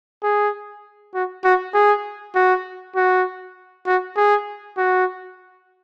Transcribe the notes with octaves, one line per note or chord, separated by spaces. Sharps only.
G#4
F#4
F#4
G#4
F#4
F#4
F#4
G#4
F#4